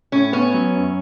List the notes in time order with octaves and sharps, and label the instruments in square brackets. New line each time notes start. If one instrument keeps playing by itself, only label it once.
[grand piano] A2 [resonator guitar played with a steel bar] C#4
[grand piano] B3 [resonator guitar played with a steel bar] C#4
[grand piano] F#3
F#2